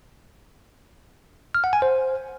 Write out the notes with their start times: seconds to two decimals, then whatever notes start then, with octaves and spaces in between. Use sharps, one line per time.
1.55 F6
1.64 F#5
1.73 G#5
1.82 C5